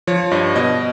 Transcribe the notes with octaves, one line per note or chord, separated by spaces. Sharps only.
F3 C#5
G2 D#5
B2 D#5